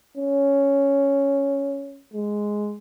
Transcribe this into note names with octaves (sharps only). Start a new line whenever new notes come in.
C#4
G#3